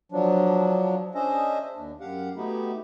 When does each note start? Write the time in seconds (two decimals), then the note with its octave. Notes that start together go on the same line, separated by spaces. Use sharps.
0.12 F3 F#3 D4
1.15 C#4 D4 G#4 C5 D#5 E5
1.75 D#2 D4
2.00 F#2 G4 F5 F#5
2.36 A3 B3 D#4 E4 F#4 G4